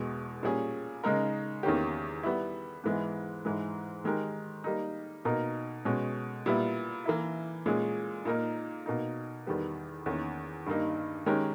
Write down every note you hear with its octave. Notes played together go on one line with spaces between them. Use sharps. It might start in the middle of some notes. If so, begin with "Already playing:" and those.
Already playing: E2 B2 G#3
A#2 G3 C#4 G#4
C#3 G#3 D#4 A#4
E2 D#3 A#3 C#4 G4
G3 B3 E4
G#2 E3 G#3 B3
G#2 E3 G#3
D#3 G#3 D#4 G4 A#4
G3 A#3 D#4
B2 A#3 D#4 A#4
B2 G#3 C#4
A#2 G3 B3 E4
E3 A#3 E4
A#2 G#3 C#4 G#4
A#2 A#3 D#4 A#4
B2 A#3 D#4
E2 D#3 G3 B3
E2 D#3 A#3 C#4
G2 D#3 G3 A#3 D#4
D#3 G#3 C#4 G4 A#4